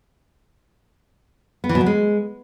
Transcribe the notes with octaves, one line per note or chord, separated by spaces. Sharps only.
B3
E3
B2
F#3
G#3